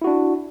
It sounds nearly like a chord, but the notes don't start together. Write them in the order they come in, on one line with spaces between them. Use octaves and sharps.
E4 F#4 D4